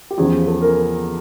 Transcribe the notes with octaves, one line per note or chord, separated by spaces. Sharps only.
G4
E2 C#3 F3 G#4
A4
A#4